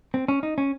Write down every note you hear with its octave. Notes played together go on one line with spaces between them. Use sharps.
C4
C#4
D#4
C#4